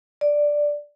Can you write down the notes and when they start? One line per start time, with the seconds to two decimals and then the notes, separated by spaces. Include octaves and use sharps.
0.21 D5